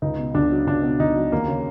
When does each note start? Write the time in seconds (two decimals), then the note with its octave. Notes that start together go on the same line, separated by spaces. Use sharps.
0.02 C#2 D#4
0.18 B2
0.34 C#2 D4
0.51 F#3
0.67 C#2 D4
0.83 B2
1.00 C#2 D#4
1.16 F#3
1.32 D#2 A#3
1.48 C#3